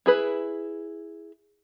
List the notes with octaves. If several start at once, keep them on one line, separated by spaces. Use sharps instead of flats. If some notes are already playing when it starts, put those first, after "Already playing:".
E4 G#4 B4